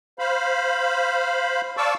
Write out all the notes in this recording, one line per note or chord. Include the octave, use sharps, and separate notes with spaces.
C5 F5 B5
D5 F5 A5 C#6 D6 E6